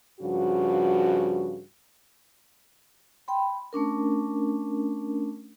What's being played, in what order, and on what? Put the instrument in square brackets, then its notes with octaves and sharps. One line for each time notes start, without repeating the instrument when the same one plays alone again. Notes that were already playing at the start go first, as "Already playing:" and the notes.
[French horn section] G2 C#3 F3 F#4
[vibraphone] G5 B5 C6
A3 C#4 D4 A#4